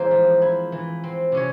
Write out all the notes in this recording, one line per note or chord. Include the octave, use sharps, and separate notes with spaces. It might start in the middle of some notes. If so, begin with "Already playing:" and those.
Already playing: E3 G#3 A#3 C4 G#4 A#4 C5
F3
E4
E3
C4
C3 C#4 C#5